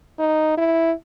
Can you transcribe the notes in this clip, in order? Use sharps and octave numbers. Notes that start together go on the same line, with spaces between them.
D#4
E4